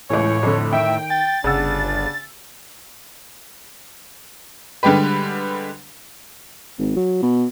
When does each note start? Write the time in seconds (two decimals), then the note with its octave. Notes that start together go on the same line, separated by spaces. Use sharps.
0.10 C#2 A2 E3 C#5
0.43 F2 D3
0.73 D#3 E5 G5
1.10 G5 A6
1.44 G1 C#3 D4 F#5 E6
4.83 D3 G3 G#3 G4 B4
6.78 G#1
6.96 F#3
7.22 B2